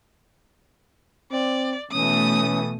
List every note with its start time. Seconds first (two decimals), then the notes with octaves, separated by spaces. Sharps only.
1.32 C4 D5
1.91 B2 E3 A3 C#4 D#6